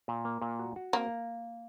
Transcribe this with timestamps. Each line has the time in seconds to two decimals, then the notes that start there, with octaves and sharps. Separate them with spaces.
0.08 A#2
0.25 A#3
0.42 A#2
0.59 F#4
0.76 F#4
0.93 A#3 C4